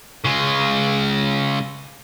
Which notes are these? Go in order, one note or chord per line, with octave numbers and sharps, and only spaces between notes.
C#3 G#3